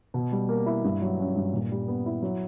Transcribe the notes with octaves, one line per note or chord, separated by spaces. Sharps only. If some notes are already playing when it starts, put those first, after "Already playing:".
B2
G3
A#3
E4
G2
F#3
C#4
G2
A#2
G3
B3
E4
F#3